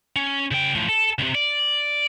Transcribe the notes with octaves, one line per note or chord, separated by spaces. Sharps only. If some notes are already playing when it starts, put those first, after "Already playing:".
C#4
C#3 G5
A2 F3
A4
C#2 C3
D5